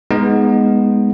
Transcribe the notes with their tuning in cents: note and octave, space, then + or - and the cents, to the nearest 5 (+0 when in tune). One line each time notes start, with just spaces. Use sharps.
G#3 +0 B3 +0 D#4 +0